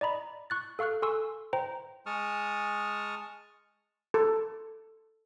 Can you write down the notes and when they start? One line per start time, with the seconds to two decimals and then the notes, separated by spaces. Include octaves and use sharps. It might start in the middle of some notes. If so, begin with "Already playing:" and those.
0.01 D5 D#5 A#5 B5
0.50 C#6 F#6 A6
0.79 A4 F5 C#6 F6 F#6
1.02 A4 G#5 C6 C#6 E6
1.53 C5 G5 A#5
2.06 G#3 A5 C#6 D#6 F6
4.14 A4